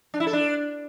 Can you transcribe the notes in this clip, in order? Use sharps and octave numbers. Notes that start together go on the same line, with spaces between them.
D4
E4
A4
D4